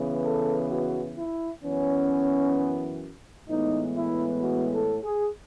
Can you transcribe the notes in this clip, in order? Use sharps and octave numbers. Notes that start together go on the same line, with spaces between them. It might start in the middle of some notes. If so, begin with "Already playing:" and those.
Already playing: C#3 E3 B3
A4
F#4
E4
F#2 E3 B3 C#4
A2 E3 G#3 B3 D#4
E4
F#4
A4
G#4